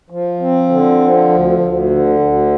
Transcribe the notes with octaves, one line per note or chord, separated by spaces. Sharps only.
F3
C4
D3
F3
D2
D2
D3
D2